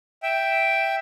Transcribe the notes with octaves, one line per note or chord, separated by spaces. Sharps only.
E5 G5